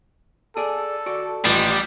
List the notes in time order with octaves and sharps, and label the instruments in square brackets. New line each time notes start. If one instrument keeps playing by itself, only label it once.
[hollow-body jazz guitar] G#4 D5 [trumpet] A4
[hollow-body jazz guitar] F#4 D5
[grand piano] A1 [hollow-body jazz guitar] D#2 F4 D#5 [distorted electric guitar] G3